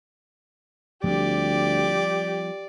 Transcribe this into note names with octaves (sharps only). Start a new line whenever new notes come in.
D2 F3 G3 C4 G4 D5